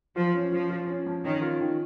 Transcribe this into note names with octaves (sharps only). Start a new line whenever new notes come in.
F3 F4
C#4
F3 F4
F4
C#4
F3
D#3 C#4
F4
D#3